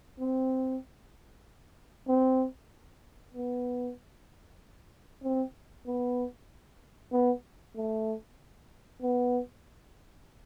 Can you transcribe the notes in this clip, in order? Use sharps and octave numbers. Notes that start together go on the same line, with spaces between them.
C4
C4
B3
C4
B3
B3
A3
B3